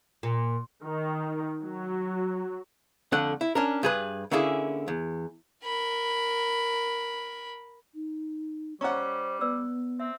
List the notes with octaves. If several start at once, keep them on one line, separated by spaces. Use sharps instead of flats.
A#2
D#3
F#3
F2 D3 A3 F#5
E4
C#4 D4 A#4
G2 G#4 B4
D3 A#3 C#4 E4 G#4
E2
A#4 B5
D#4
G3 C#4 C5 D#5 F#5 A#5 C#6
B3 B4 D5 E6
C4 E5